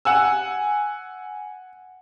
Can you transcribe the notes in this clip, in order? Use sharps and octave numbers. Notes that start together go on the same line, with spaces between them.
F#5 G#5 E6